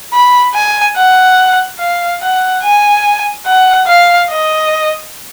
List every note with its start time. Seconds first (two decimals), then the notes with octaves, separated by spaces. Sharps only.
0.13 B5
0.55 G#5
0.96 F#5
1.79 F5
2.22 F#5
2.63 G#5
3.46 F#5
3.87 F5
4.30 D#5